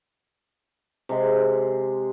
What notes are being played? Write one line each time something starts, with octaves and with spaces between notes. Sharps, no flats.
C3 G#3